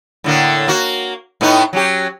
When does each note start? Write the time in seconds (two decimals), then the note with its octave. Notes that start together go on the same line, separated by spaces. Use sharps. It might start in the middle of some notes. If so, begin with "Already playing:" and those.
0.24 A2 D3 A#3
0.68 A#3 F#4
1.41 A2 B3 D#4
1.73 F#3 C#4 G4